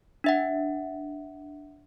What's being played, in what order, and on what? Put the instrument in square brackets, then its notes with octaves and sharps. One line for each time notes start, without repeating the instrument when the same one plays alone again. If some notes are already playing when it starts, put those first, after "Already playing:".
[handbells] D4 E5 F#5